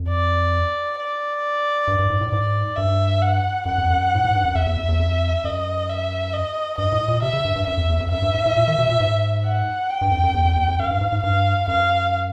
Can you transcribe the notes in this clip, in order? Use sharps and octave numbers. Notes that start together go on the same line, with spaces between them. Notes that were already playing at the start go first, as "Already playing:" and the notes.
Already playing: F2
D5
D5
G2
G2
G#2
A2
G#2 D5
G2 E5
F#5
F#2 F#5
F2
F#2
A2
G#2
G2
F#2
F2 E5
E2
F2
E2
F2
F#2 D#5
E5
D#5
G2 D#5
A2
A#2
C3 E5
C#3
G2
G2
F#2 E5
F2
E2
F2
F#2 E5
G2
G#2
A2
A#2
D#3
B2
A#2
G#2
F#5
G5
G2
F2
F#2
E2
F2
E2
F2
F#2 F5
G2
G#2
G#2
G2 F5
F#2 F5